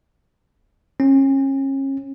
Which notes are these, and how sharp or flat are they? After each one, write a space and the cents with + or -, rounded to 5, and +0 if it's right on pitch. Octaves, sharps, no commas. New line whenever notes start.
C#4 -35